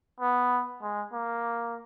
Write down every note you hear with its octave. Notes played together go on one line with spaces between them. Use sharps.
B3
G#3
A#3